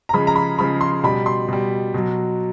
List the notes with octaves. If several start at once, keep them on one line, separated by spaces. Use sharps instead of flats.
A#5
C#3 F3 G#3 B5
A#5
B5
C#3 F3 G#3 B5
C6
B2 G3 B5
C6
B2 G3
B2 F#3